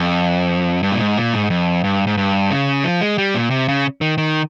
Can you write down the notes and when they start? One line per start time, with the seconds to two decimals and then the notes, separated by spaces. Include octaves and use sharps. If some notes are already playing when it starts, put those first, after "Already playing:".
Already playing: F2
0.83 G2
0.92 A#2
1.00 G#2
1.17 A#2
1.34 G#2
1.50 F2
1.84 G2
2.07 G#2
2.17 G2
2.51 C#3
2.84 F3
3.01 G#3
3.18 G3
3.34 A#2
3.51 C3
3.68 C#3
4.01 D#3
4.18 D#3